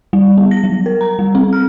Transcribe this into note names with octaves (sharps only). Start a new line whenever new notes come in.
G3
B3
A#6
F#3
A#4
A#5
G3
C4
F6